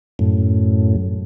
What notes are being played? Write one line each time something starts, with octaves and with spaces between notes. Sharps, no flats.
F#2 A2